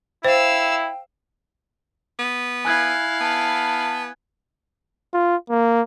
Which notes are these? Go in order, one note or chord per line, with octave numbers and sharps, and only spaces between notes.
E4 C5 F5 G5 E6
B3
E4 F5 G#5 F#6 G#6
B3 A5
F4
A#3